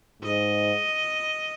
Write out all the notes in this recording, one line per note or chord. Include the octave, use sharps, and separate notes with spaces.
G#2 D#5